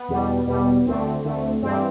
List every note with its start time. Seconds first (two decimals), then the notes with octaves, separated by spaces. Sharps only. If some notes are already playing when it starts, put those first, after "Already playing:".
Already playing: B3
0.08 E2 B2 G3
0.47 E2 B2 G3
0.86 D2 D3 A3 C4
1.24 D2 D3 A3
1.62 G2 E3 G3 C4